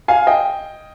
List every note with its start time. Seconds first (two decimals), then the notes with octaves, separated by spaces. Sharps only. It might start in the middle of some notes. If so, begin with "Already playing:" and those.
0.08 F5 G#5
0.27 D#5 G5